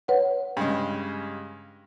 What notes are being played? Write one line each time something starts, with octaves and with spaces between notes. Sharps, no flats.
B4 C#5 F#5
G2 C#3 G#3